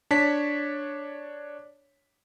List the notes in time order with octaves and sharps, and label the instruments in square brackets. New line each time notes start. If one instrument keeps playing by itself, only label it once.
[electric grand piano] D4 C#5 A5 B6